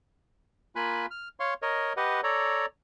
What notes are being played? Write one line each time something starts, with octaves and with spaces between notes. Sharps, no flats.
A#3 F4 G#5 B5 F#6
F6
C#5 F5 C6 C#6
A#4 C#5 D#5
G4 B4 D#5 F#5
A4 C#5 D5 A#5